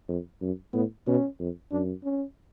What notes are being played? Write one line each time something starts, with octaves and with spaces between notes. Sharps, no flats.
F2
F#2
A2 B3
B2 C#4
F2
F#2 D4
C#4